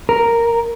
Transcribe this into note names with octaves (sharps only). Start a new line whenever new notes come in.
A#4